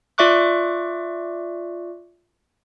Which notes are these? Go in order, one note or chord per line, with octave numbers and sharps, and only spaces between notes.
F4 D5 E5 C#6 D6 F#6